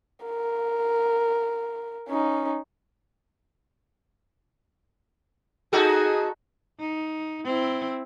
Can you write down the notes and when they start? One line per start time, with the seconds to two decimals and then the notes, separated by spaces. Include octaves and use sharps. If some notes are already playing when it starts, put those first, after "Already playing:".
0.24 A#4
2.09 C#4 D#4
5.73 D#4 F#4 G#4 A4
6.79 D#4
7.45 C4 E4